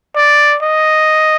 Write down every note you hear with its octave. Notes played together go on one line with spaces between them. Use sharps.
D5
D#5